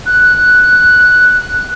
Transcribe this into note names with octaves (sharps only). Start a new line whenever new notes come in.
F#6